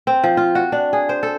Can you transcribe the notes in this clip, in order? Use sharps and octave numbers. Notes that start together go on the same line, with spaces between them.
C4
F3
F4
F#4
D4
G#4
C5
A4